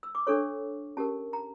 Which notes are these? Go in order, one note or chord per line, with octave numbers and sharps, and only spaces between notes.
E6
D6
D4 A4 C#5 C#6
C#4 G4 A#4 A5
A#5